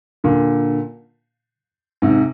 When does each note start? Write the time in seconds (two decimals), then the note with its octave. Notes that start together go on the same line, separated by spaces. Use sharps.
0.24 A#2 D3
2.02 G#2 C3